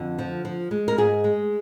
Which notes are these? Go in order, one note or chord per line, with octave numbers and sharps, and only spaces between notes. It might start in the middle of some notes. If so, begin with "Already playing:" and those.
Already playing: F2 D3
F3
F3
G#3
A#4
G#2 G#4
G#3